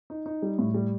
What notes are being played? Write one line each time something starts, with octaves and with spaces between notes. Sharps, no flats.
D#4
D#4
G3
A2
G3